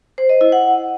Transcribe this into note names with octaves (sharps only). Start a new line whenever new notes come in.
C5
D#5
E4
F#5